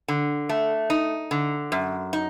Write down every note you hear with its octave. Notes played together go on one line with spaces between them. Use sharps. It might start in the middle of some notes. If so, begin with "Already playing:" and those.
D3
A3
D#4
D3
F#2
D#4